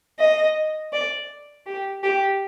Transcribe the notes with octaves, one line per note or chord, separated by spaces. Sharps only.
D#5
D5
G4
G4